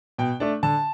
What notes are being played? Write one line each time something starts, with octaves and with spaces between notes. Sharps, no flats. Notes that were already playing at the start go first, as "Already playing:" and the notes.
B2 G5
A3 D4
D3 A5